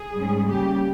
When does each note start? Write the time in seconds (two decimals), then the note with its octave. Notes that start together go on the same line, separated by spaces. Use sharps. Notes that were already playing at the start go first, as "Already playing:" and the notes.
Already playing: G#4
0.13 G#2 G3 C#4
0.45 C#3 G3 A#3 G4